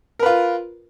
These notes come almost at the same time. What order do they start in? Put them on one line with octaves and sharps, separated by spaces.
A#4 B4 F4